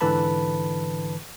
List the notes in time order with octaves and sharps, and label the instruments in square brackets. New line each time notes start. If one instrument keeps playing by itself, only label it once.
[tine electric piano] G#2 D3 E3 B4 A5 B5